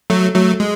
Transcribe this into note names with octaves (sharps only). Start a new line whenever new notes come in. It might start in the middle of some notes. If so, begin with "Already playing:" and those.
F#3 A3
F#3 A3
G#3